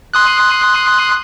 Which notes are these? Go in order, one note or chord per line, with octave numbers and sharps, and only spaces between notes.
C6 D#6 F#6